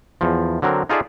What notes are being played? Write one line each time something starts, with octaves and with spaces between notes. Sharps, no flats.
E2 F3
D3 F#3 C4 A#4
D#4 F4 G#4 A4 D5 E5